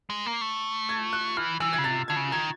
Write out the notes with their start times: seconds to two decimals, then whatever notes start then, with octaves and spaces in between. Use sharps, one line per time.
0.10 G#3
0.26 A#3
0.41 A3
0.89 G#6
1.13 F#6
1.37 E3 F6
1.60 E3 E6
1.73 G#6
1.78 C#3
1.84 C3 A6
2.08 D3 G#6
2.16 C#3
2.32 D#3 G#6